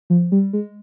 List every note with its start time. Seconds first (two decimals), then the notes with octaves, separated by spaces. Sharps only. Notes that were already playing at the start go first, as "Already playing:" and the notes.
0.10 F3
0.32 G3
0.53 G#3